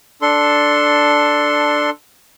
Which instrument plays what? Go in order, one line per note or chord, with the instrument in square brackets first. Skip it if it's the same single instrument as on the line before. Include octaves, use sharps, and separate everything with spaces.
[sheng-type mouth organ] D4 A4 C6